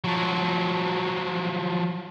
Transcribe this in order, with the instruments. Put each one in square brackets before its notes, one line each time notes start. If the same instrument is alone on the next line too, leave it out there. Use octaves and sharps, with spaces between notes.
[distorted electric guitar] F3 F#3